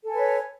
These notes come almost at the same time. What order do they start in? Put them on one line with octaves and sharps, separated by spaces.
A4 G#5 B4 C#5